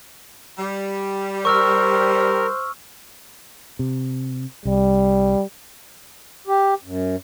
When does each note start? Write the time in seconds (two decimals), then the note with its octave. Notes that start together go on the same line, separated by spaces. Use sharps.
0.58 G3
1.45 A#4 C5 C#6 E6 F6
3.79 C3
4.65 C2 G3
6.47 G4
6.84 F#2